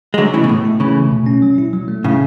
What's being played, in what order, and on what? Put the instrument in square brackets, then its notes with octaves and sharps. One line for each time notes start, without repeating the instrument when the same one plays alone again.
[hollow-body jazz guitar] G#3
[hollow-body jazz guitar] D3 F#3 [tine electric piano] A3
[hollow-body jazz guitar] C#3 E3 [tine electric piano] E4
[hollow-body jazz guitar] B2
[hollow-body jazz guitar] A2 [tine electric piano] A3
[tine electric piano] E4
[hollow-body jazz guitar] C#3 E3 [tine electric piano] A3
[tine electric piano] A3
B2
C#4
F#3
E4
F#3
A3
[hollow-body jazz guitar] A2 C#3 [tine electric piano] E4